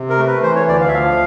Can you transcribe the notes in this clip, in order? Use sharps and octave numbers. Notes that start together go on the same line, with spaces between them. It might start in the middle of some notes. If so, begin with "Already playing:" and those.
Already playing: C3
A#4
A3
B4
E3 C5
C#5
D2 D5
F5
E5
F3 F5